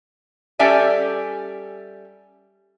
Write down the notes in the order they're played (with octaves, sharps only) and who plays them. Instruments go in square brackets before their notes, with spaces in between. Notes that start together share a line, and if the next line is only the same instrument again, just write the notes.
[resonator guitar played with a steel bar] G3 C#4 A4 D5 E5 G#5